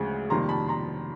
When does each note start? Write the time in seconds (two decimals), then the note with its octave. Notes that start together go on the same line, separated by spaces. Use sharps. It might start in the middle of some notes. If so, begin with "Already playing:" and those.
Already playing: D2 C#3 F3 G#3
0.30 F2 C3 D#3 G3 A#3 A#5 C6
0.49 A5 B5
0.68 A#5 C6